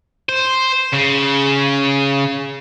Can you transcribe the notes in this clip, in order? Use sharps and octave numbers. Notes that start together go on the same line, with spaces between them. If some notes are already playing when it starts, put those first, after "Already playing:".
C5
C#3